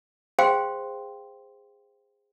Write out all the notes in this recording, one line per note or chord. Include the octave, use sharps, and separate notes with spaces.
G#4 C5 F5 G5 C6